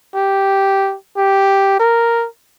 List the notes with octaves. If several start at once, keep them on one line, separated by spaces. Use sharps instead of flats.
G4
G4
A#4